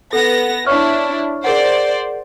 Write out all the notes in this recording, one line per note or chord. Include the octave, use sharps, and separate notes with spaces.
B3 A4 A#6
D4 E4 C#5 C#6 F6
G#4 A#4 C5 D5 F#5